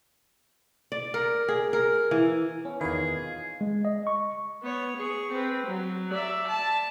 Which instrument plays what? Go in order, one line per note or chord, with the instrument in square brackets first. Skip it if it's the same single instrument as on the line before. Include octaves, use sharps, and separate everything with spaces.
[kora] D5
A#4
G#4
A#4
E3
[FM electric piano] B3 [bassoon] C#4
[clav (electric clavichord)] E2 D#3 [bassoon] F4 [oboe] G#4 [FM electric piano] B4 D#5 F5
[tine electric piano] G#3
D#5
C#6
[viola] B3 C#5
G#4 C#6
C4 B4
F#3
D5 E5
A5